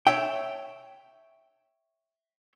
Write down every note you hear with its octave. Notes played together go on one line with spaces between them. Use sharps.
C#5 E5 G5